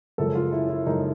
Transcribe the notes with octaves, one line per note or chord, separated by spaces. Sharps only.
F#2 C#3 F3 G#3 A4
F4
E4
E4
F#2 C#3 F3 G#3 D#4